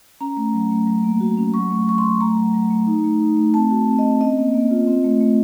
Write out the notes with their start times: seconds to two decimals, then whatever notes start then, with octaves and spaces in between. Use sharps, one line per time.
0.21 C#4 A#5
0.37 A3
0.54 F#3
0.71 A3
0.87 F#3
1.04 A#3
1.20 F#4
1.38 C#4
1.54 F#3 C#6
1.70 A3
1.87 F#3 C#6
1.98 C6
2.04 F#3
2.20 A3 A#5
2.37 F#3
2.54 F#3
2.70 A3
2.87 D#4
3.04 A3
3.20 D#4
3.37 A3
3.54 C4 A5
3.71 F#4
3.87 C4
3.99 D#5
4.04 C4
4.20 C#4 D#5
4.37 A#3
4.54 A#3
4.71 F4
4.87 C4
5.04 A3
5.21 A3